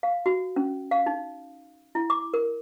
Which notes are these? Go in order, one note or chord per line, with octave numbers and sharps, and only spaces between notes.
F5
F#4
C#4
F5
D#4
E4
D6
A#4